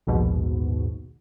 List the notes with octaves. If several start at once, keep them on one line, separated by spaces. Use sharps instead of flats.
A#1 D#2 G#2 B2